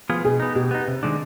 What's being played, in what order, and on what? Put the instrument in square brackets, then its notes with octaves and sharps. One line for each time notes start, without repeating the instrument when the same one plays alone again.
[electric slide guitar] F3 B3 F4 G#4
[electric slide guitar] B2 [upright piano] G#4
[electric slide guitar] B3 D#4
[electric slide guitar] B2 [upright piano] G4
[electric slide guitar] B3 D#4
C3
D#3 G#3 D4